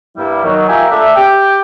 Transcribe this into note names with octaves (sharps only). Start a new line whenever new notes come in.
G2 G3 A#3 E4
D#3 F#3
F4 G4 A#4 E5 G#5
A3 D4 E5
G4 G5